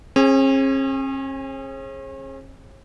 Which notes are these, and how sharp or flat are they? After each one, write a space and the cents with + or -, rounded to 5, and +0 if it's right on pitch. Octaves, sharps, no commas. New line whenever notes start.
C#4 -45 G#4 +0